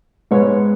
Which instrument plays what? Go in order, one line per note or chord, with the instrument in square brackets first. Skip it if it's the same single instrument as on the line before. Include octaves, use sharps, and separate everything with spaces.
[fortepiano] G#2 G#3 B3 C#5